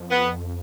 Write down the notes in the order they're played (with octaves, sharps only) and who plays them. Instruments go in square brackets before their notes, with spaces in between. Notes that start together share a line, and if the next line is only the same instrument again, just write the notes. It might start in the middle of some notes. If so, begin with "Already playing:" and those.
Already playing: [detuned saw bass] F2
[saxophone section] B3